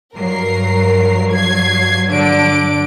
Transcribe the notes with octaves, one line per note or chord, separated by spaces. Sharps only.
G2 F#3 A#4 C7
G#6 C7
D3 D4 D7